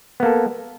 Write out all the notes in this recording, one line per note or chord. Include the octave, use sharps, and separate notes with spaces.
A#3 B3 A4